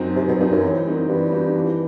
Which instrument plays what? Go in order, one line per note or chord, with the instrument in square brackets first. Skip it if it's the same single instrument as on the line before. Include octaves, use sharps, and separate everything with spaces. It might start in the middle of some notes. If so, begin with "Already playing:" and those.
Already playing: [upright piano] F#2 F#3 C4 D#4
[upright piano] F#2 [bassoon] C3
[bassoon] B2
[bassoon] G2 [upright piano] F#3 C4 D#4
[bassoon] F#2
[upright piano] E3
G3 C4 D#4 F#4
[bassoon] G2 [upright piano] E3
[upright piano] G3 C4 D#4 F#4
E3